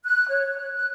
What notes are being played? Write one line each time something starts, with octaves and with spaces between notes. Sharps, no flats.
F#6
C#5
F#6
F#6